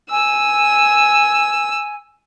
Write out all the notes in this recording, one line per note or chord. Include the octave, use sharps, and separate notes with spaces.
G#5 E6